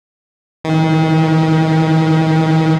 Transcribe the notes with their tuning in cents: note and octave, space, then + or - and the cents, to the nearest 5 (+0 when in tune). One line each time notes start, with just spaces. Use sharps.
D#3 +40